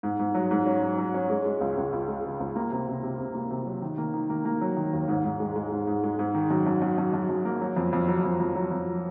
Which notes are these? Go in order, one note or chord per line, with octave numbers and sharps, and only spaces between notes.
G#2
G#2
F#3
G#2
C#4
F#3
F#3
C#4
G#3
G#3
C#2
C#2
C#2
G#3
C#3
C#2
A#3
C3
C3
C3
C3
A#3
C3
F#3
D#3
A#3
D#3
A#3
A#3
F#3
D#3
D#2
G#2
G#2
G#3
G#3
G#2
G#2
G#3
G#2
D#3
F#2
F#2
F#2
F#2
F#2
F#2
A#3
F#3
F2
F2
F#3
F2
F2
F#3
F2